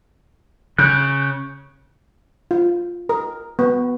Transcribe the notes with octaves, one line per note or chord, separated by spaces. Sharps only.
C#3 F#6 G6
F4
A#4
B3